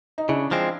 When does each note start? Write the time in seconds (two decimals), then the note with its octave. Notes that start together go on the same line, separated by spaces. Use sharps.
0.18 D#4
0.29 C#3 D4 E4
0.51 F3 G#3 C4